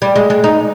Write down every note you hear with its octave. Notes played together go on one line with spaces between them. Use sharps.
G3
G#3
G#3
D#4